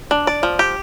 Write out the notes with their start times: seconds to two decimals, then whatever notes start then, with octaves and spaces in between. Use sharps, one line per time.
0.11 D4
0.27 D5
0.43 F3
0.59 G4